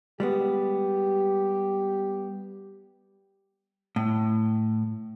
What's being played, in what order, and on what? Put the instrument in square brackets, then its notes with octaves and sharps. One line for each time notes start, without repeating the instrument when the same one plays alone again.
[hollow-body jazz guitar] G3 G#3 B3 [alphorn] G4
[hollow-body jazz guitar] A2